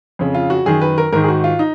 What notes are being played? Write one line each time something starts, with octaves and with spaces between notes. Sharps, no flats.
F2 C#3
F4
F#4
F#2 D#3 G#4
B4
A#4
G#2 D#3 A#4
G#4
F#4
F4
D#4